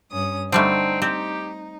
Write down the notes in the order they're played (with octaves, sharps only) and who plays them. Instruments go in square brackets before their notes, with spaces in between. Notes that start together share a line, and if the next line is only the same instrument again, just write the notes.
[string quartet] G2 C#4 D#6
[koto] D3 G3 A3 [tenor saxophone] C4 [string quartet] D#4
[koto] C4 [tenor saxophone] G4